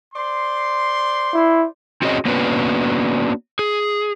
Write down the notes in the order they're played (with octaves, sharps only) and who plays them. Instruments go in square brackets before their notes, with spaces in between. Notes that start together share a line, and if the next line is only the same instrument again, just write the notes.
[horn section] C5 D5 C6
[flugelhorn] E4
[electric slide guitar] C4 C#4 F#4 G#4 C#5 D#5
A#3 B3 C#4 D4 F#4 B4
G#4